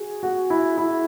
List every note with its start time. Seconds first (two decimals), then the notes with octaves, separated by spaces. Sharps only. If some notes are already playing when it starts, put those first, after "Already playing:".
Already playing: F#4 G#4
0.23 F#4
0.50 E4
0.78 E4